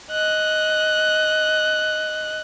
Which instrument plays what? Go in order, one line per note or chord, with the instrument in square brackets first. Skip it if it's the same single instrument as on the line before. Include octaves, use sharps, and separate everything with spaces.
[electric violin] D#5 F#6